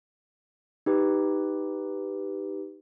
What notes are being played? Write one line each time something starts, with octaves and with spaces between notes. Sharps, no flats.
D#4 G4 B4